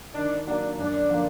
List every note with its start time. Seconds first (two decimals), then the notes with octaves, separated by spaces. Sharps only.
0.14 D#3 D4
0.46 F#3 A#3 D4
0.78 F#2 D4
1.10 D3 F3 A#3